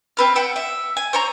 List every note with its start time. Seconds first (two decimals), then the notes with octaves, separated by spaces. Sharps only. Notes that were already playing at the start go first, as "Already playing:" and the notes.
0.17 C4 B4 F6
0.36 F#5 G5 E6
0.56 E5
0.97 G#5
1.13 C5 C#5 A#5